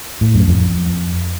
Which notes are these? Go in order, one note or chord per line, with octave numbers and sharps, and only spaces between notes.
A2
F#2
F2